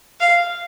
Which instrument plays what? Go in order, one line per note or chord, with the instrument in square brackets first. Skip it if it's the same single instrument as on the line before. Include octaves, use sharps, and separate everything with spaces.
[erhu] F5